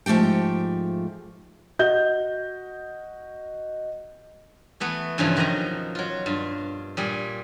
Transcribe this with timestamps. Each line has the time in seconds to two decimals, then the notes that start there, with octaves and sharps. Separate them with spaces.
0.06 G#2 F3 A3 G4 G5
1.79 F#4 D#5 G6
4.80 E3 A3 B3
5.18 G2 C#3 E3 F3 A3 F4
5.36 B2 D#3 F3 F#3 D#5 A#5
5.95 F#3 F4
6.26 G2 F4
6.97 A#2 G3 G#4